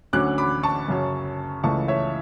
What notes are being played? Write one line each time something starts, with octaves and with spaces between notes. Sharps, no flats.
D2 D3 F#3 C#4 D6 F#6
B5 D6
A5 C#6
F#2 C#3 F#3 C#4
C#2 C#3 E3 A3 A5 C#6
C#5 E5